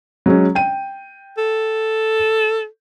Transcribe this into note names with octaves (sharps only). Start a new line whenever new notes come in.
F#3 G#3 C#4
G5 D#7
A4